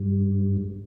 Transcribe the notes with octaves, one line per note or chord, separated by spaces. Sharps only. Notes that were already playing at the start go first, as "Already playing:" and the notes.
Already playing: G2